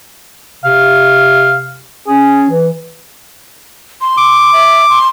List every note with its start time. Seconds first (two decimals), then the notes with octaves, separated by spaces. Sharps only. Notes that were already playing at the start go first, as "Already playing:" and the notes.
0.64 C3 F5
2.07 C#4 G#4
2.50 E3
4.01 C6
4.17 D6
4.53 E5
4.89 C6